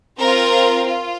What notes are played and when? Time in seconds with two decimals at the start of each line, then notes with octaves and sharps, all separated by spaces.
0.19 C4 F4 A#4 A#5
0.86 F4